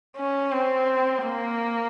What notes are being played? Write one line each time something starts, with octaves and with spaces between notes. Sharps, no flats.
C#4
C4
A#3